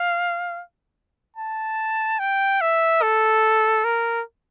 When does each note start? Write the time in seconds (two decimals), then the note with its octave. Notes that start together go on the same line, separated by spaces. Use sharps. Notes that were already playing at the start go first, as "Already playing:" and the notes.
Already playing: F5
1.37 A5
2.19 G5
2.61 E5
3.02 A4
3.85 A#4